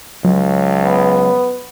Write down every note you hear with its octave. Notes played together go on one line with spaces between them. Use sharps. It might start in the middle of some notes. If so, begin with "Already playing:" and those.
C#2 F#3
B3